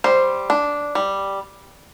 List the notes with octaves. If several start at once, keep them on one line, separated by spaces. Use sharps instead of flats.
G3 C5
D4
G3